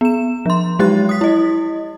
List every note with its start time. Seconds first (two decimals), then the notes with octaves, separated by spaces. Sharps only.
0.01 B3 E7
0.46 F3 C6
0.79 F#3 G#3 G4 F#6 A6
1.09 D#6 B6
1.21 E4 D#5